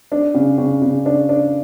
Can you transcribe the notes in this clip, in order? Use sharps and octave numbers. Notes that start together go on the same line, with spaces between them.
D4
C#3
C#3
C#3
D4
D4